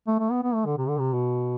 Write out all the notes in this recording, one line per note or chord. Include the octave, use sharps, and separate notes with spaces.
A3
A3
B3
B3
A3
D3
C3
D3
C3
B2